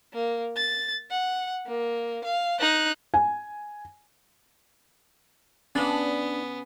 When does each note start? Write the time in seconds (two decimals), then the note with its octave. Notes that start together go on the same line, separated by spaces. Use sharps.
0.14 A#3
0.56 A6
1.11 F#5
1.66 A#3
2.24 F5
2.60 D#4 F#6
3.14 G#5
5.75 C#3 B3 D4